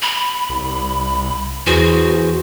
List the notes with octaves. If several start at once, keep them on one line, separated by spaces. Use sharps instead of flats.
B5
C2
E2 E3 F#4 G#4 C5